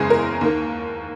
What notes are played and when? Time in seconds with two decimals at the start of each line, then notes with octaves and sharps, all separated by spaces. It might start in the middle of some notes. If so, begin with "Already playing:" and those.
Already playing: F#1 E2 C#3 E3 G#3 G#4
0.10 A#4
0.41 D#2 D#3 A#3